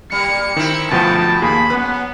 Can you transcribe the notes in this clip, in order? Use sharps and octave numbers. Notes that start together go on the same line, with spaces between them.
G3 A#3 C#7
D#3 C4 E4
D2 B2 F3 B3 G5 A5
D#2 A#3 G#4 B5
F#2 B3 B4